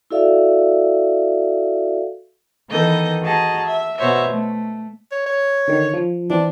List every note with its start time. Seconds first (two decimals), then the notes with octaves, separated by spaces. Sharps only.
0.11 E4 F#4 A4 D5 E5 F5
2.69 D#3 E3 B3 A4 D#5 G6
3.22 F#4 G#4 D#5 A5 A#5
3.65 E5
3.98 B2 F#4 C5 C#5 E5
4.28 A3
5.12 C#5
5.26 C#5
5.68 D3 D#3
5.94 F3
6.30 E3 C4 D4